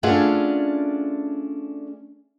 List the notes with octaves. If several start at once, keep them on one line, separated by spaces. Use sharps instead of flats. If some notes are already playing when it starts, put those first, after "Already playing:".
A3 C#4 D4 F4 G#4 F#5